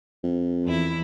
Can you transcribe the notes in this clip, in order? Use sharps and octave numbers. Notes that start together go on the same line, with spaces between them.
F2
E2 E4